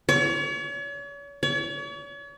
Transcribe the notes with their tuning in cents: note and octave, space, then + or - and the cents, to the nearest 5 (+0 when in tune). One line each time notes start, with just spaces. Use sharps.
C#5 +40
C#5 +40